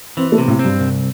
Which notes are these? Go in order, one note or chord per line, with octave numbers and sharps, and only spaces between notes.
E3 C4
A3
C3
A2
C4
G2
C2